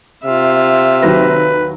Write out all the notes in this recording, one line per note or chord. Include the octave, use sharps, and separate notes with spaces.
C3 F4 E5
D#2 F#3 B4 A#6